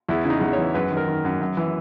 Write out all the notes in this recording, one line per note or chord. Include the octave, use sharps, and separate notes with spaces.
E2 E4
C#3 E4
D#4
E2
E3 C#5
F#2 B4
D#3
A#4
D#3
F#2
F#2
E3